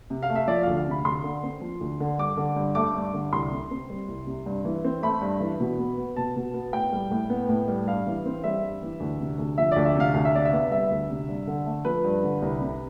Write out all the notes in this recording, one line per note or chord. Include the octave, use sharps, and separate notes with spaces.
C3
F5
A3
E5
F3 D5
D2 F5
F5
C3 B5
D2 C6
D3
C4
F3
D2
D3
G2 D6
D3
G2
A3 D6
G2
D3
C2 C6
C3
C4
G3
C2
C3
G2
E3
C4
A3 B5
G2
E3
B2
B3
B3
B2 A5
B2
B3
A2 G5
G3
A2
B3
A2
G3
G2 F5
E3
C4
G3 E5
G2
E3
D2
C3
D2
F3 E5
D2 D5
E5
C3 F5
D2 F5
E5
C3 D5
E5
B3
G3 E5
D2
C3
G2
D3
A3
F3 B4
G2
D3
C2
C3